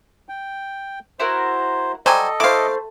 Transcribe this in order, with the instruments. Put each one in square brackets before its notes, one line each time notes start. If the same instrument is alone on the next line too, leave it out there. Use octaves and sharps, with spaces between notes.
[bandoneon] G5
[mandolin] E4 F#4 A#4 [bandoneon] C5
[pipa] F#3 G3 [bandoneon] A4 D#5 [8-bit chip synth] C5 G#5
[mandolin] A3 [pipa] E4 C5 [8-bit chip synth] F5 D6